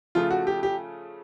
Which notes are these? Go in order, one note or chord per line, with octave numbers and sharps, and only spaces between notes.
C#3 F3 A3 F4
F#4
G4
G4